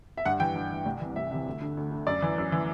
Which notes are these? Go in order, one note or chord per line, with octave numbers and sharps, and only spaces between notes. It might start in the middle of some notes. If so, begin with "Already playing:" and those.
E5
G2 F#5
E3 G5
G2
E3
C2
C3 E3
C2 E5
C3 E3 E5
D2
D3
D2
D3
F#2 D5
E3
F#2
E3